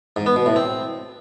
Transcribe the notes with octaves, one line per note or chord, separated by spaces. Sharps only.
G#2
B3
B2
A2
C4